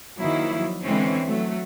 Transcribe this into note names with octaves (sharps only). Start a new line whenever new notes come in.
D#3 F3 F#3 A#3 E4
D3 E3 G#3 C4 C#4 E4
F#3 A3